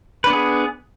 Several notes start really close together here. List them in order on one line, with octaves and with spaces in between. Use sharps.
B4 D4 B3 G#4